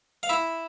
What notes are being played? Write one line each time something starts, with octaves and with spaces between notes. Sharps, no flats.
F5
E4 E5